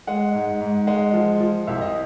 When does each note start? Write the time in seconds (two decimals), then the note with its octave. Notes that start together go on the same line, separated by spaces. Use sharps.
0.07 G#3 F#5
0.34 G#2
0.61 G#2
0.87 G#3 F#5
1.13 F3
1.40 F3
1.67 C2 E5
1.81 D#5